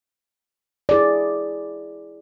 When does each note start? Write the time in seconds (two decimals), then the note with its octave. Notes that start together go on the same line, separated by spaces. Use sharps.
0.89 E4 G#4 D5